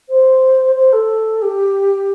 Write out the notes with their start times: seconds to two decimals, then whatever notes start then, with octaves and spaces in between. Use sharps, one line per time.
0.09 C5
0.75 C5
0.93 A4
1.42 G4